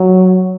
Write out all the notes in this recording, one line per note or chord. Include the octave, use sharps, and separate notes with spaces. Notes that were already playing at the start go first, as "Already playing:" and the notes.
Already playing: F#3